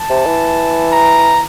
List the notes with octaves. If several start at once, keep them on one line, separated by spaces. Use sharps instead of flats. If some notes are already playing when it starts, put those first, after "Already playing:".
Already playing: A5
C3
E3
A#5